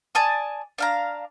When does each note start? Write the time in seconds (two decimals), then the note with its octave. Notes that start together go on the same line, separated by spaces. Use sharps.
0.15 D5 G#5 A5 D#6
0.78 D4 F5 A#5